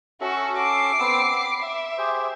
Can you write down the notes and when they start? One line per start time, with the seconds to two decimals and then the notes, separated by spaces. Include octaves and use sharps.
0.21 C#4 F#4 A4 E5
0.57 D6 C7
1.00 B3 C4 E6
1.33 B5
1.63 E5
1.98 G4 G#4 C5